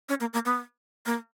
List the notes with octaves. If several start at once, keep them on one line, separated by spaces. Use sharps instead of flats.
C#4
A#3
A#3
B3
A#3